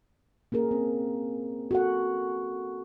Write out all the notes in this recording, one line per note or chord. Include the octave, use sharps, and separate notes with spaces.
A#3 C#4 G#4 A#4
C4
F#4 A4 F#5